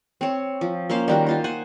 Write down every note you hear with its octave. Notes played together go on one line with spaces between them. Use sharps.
C4 C#5
F3
A#3 C#4 C5 F5
D#3 G3 F#4
D#4 F4 C5
C5 F#5 G#5